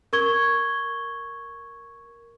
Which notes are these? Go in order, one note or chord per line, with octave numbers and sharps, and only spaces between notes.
A#4 C#6 G#6 G7